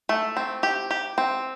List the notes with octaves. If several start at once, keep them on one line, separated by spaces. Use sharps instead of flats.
A3
C4
G4
G4
C4